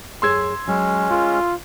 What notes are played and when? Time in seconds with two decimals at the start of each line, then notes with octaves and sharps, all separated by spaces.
0.22 F#2 G#4 C#5 C6 E6 G#6
0.68 F#3 G#3 C#4
1.11 F4 A#4